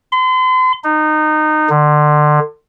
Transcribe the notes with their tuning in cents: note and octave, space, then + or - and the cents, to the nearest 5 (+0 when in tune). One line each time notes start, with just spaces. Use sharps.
C6 -40
D#4 -20
D3 +30